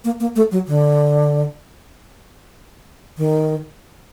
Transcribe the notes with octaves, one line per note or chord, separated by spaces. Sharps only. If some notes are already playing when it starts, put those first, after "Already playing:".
A#3
A#3
A3
F#3
D3
D#3